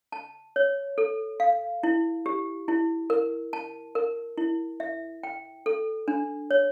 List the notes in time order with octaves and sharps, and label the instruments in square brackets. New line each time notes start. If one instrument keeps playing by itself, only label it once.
[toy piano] A5
C#5
A4
F5
E4
G4
E4
A#4
A5
A#4
E4
E5
G5
A4
D4
C#5